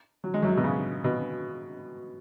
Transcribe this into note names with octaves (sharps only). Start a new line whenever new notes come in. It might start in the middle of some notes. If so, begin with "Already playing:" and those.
F#3
G#3
F#2 F#3
B2
C#3
B2